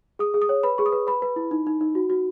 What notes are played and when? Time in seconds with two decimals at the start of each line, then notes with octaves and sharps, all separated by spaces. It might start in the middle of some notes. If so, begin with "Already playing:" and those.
0.19 G#4 D#6
0.34 G#4
0.42 D#6
0.49 C#5
0.63 B4 B5
0.78 G#4 C#6
0.86 D#6
0.92 B4
1.07 B4 B5
1.22 B4
1.36 E4
1.51 D#4
1.67 D#4
1.81 D#4
1.95 F#4
2.10 F#4